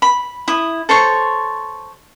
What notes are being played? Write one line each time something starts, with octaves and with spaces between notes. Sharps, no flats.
B5
E4 D#6
A4 C5 C#5 C#6